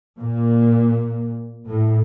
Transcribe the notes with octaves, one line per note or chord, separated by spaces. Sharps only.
A#2
A2